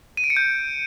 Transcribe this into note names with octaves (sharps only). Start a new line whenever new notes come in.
D#7
D7
C#7
G6